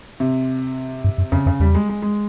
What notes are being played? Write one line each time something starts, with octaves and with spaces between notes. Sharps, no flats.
C3
G2
F#2
F2 C#3
F2 C#3
E2 G3
G#3
G#3
G#3